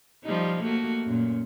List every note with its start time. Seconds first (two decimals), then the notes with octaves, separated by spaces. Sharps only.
0.24 F3 G3 D#4
0.63 A3 A#3 F#4
1.05 F#2 A#2